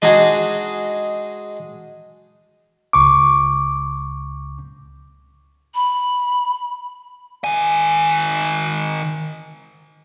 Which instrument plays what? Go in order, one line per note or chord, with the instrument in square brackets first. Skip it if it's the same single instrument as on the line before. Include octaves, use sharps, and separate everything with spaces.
[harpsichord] G#3 D4 D#4 F#4 G#4
[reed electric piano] C#2 C#6 D6
[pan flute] B5
[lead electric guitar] D#3 G#5